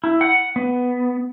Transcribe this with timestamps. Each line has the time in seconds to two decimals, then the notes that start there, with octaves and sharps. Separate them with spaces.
0.04 E4
0.21 F#5
0.56 B3